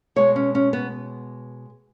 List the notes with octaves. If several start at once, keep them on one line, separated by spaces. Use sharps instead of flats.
B2 G#3 C#5
C#4
C#4
B3